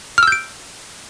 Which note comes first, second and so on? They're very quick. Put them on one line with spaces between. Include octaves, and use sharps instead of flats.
F6 E6 G6 D7